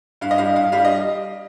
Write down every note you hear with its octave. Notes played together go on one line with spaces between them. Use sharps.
G2 F5
D#5
G3 F5
G2 F5
G3 F5
D#5